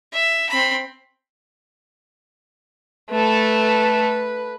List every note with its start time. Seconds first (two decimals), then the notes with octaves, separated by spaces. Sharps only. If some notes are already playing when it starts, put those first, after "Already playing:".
0.13 E5
0.49 C4 B5
3.11 A3 A4 B4